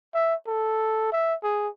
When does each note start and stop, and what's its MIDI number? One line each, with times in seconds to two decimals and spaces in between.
0.14 0.35 76
0.47 1.11 69
1.12 1.34 76
1.43 1.68 68